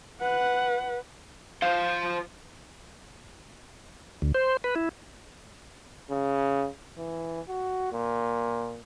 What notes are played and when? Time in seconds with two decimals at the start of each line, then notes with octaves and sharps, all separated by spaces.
0.21 B4 F#5
1.62 F3 C5 F5
4.22 D2
4.35 C5
4.64 B4
4.76 E4
6.10 C#3
6.98 E3
7.48 F#4
7.93 A#2